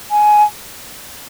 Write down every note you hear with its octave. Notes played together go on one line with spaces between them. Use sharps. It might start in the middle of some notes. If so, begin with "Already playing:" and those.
G#5